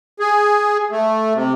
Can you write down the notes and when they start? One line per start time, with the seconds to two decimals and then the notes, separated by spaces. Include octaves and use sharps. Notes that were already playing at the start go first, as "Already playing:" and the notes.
0.20 G#4
0.91 A3
1.34 C3